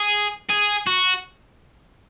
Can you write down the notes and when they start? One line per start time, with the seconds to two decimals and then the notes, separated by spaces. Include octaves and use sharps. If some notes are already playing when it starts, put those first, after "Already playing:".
Already playing: G#4
0.49 G#4
0.87 F#4